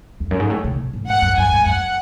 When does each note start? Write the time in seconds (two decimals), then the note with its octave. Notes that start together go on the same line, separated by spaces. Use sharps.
0.20 E2
0.31 F#2
0.40 G#2
0.50 A2
0.64 C#3
0.79 B2
0.93 A2
1.08 G#2 F#5
1.22 F#2
1.38 F#2 G#5
1.52 G#2
1.66 F#2 F#5